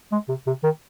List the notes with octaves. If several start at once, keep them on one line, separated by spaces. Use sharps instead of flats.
G#3
C3
C3
D#3